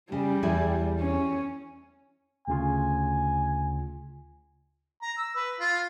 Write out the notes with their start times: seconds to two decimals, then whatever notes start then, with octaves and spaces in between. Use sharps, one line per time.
0.12 C#3 G3
0.43 E2 E4 G#4
0.99 C#4
2.48 D2 C#3 F4 G#5
5.02 A#5
5.18 E6
5.36 B4
5.60 F4